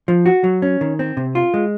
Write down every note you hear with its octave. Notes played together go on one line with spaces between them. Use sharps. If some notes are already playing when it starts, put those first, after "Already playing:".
F3
F#4
F#3
C#4
D#3
C4
C3
F4
G#3